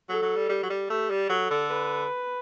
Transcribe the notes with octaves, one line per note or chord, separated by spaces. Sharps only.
F#3 A4
F#3
G3
G3 G4
F#3
G3
A3 G4
G3
F#3 A4
D3
B4